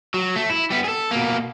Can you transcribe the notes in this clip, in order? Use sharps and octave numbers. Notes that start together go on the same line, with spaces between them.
F#3
A3
E4
G3 B3
G#4 A4
B2 A#3